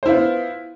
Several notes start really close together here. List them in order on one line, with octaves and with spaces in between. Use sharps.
C5 E4 F4 B3